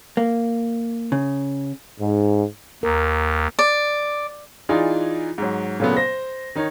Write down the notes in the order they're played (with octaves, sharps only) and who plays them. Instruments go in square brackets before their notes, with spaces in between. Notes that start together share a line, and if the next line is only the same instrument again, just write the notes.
[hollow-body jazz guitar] A#3
C#3
[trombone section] G#2
[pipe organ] D#2 [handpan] A#4
[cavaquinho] D5
[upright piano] E3 D#4 F4 G#4 D5
G#2 F#3
A#2 C#3 F#3 A3 B3
C5 A#6
D#3 D#4 C#5